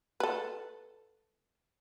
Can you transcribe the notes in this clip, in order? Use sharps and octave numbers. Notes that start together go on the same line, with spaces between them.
A4 B4